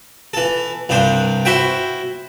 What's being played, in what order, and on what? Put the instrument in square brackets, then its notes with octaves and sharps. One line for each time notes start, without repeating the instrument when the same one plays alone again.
[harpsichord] E3 A4
C2 G2 D4 C5
E4 F#4 C5 E5 G5